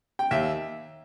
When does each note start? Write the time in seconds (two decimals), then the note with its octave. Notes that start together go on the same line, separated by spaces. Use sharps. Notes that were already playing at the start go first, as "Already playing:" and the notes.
0.19 G5
0.31 D#2 E5